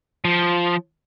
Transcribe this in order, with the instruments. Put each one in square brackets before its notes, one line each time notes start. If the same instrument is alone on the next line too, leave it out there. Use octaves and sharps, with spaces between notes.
[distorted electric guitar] F3